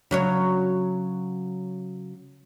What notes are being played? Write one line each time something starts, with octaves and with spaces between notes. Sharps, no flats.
C#3 F#3 C#5